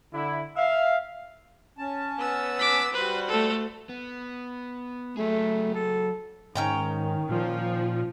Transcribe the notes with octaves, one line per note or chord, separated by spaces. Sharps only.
D3 E4
E5 F5
C#4 A5
B3 E6
D6 B6
G3 F#4 B4 C5
A3 A4
B3
F#3 A3 G#4
A4
G#2 D#3 C#4 G5 A#5
A#2 F3